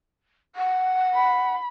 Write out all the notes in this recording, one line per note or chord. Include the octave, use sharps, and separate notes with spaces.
F#5
B5